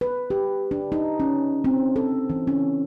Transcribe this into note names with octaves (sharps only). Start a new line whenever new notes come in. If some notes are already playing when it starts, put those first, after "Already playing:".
B4
G4
D4
D#4
C#4
C4
A4
E3
C#4